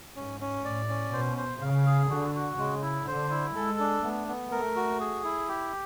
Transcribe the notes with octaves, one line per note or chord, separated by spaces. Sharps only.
G#2 C#4
C#4
A2 D5
C#4
B2 C5
C5
C#3 F5
G#4
D3 F#4
F#4
C#3 G#3
E4
D3 C5
E4
G#3 A4
D4
A3 B3
B3
A3 A#4
F#4
G#4
E4
G4